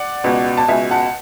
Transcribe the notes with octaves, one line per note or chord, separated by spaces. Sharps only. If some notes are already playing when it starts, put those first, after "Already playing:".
Already playing: D5 F#5
C#2 B2
A5
C#2 B2 E5 G#5
F#5 A5